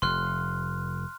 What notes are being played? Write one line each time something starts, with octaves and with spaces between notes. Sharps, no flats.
F1 C6 F6 F#6